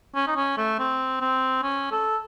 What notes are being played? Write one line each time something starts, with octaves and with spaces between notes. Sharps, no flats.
C#4
D#4
C#4
A3
C4
C4
C#4
A4